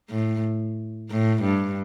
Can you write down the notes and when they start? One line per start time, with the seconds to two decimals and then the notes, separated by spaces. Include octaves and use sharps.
0.10 A2
1.10 A2
1.43 G2